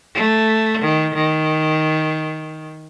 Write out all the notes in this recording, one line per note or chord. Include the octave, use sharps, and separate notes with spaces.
A3
D#3
D#3